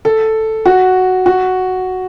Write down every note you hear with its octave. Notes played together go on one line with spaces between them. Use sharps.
A4
F#4
F#4